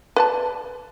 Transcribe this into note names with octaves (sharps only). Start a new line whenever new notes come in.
B4 D5 A5